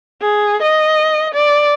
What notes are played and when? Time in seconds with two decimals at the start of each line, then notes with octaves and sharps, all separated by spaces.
0.22 G#4
0.62 D#5
1.34 D5